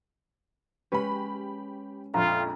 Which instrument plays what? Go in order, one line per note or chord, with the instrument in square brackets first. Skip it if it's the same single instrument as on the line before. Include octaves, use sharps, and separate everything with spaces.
[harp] G#3 C#4 B4 [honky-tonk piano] G4 B5
[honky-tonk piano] A#1 F2 [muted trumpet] F4 [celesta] A#5